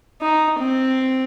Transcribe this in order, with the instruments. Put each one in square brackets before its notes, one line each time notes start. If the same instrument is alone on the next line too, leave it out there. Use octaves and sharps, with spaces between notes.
[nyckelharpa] D#4
C4